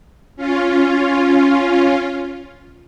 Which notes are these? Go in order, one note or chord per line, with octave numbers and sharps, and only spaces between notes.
C#4 F4